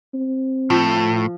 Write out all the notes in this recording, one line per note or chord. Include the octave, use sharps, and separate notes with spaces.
C4
A2 F3